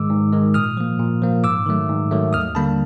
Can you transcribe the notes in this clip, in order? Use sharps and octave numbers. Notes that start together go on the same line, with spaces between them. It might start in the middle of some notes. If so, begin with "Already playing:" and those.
Already playing: G#2 D#3 G#3 D6 E6
G#2
D#3 G#3
A#2 D#6 F6
F3 A#3
A#2
F3 A#3
G#2 D6 E6
D#3 F#3 A3
G#2
D#3 F#3 A3
D#2 D#6 F6
D3 G3 A#3 A5 B5